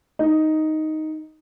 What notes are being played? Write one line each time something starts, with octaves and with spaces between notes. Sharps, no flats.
D#4